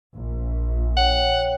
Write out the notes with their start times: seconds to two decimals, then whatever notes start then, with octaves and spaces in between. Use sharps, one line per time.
0.15 A#1
0.97 C#5 F#5 G5